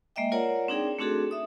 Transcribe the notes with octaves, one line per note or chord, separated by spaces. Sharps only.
G#3 A#3 D#5 E5 G5
F4 A#4 C#5 D5 F#5 A#5
C4 D4 D#4 G#4 D5 G5
A3 C4 D4 F#4 G#4 A4
E5 D#6